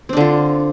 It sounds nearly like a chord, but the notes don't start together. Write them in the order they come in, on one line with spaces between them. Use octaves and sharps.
C4 D4 D3 F4